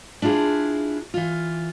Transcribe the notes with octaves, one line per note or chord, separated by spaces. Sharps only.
D4 E4 F4 G4 G#4
E3 F4